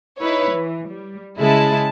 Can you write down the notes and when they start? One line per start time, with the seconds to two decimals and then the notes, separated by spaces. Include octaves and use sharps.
0.19 D#4 E4 B4 C#5
0.51 E3
0.89 G3
1.37 C#3 G#3 E4 A5